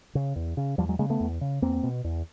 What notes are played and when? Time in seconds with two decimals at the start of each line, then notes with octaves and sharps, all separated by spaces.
0.15 C#3
0.36 E2
0.57 C#3
0.78 E2 F3 G3
0.89 F#3 G#3
0.99 C#3 G#3 A#3
1.10 A3 B3
1.20 E2
1.41 C#3
1.62 E2 A#3 C4
1.83 B2
2.04 E2